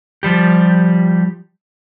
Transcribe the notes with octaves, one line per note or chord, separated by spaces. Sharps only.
F3 G3 G4